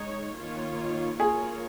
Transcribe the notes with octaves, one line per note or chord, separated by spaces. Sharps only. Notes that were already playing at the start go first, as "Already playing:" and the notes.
Already playing: G#3 D#4 C#5
D#3 A#3 F4 C#5
A#3 F4 G#4 A#4 C#5